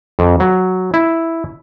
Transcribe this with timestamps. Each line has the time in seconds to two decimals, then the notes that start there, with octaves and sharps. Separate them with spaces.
0.19 F2
0.40 F#3
0.94 E4